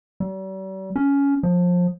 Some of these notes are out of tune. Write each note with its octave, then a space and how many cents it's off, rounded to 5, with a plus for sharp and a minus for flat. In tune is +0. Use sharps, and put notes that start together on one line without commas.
G3 -45
C#4 +15
F3 +25